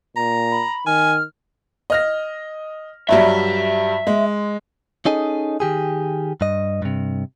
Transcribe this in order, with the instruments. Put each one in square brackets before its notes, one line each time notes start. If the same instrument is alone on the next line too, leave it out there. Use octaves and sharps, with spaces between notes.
[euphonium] A#2 [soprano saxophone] A#5
[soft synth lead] B5
[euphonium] D#3 [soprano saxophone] G#5 [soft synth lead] F6
[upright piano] D#5 F6 A#6
[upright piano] G2 F#3 G3 [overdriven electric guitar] E5
[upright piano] G#3
[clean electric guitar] C#4 D#4 G#4 A4 D#5
D#3 G4 G#4
G2 D#5
G2 C3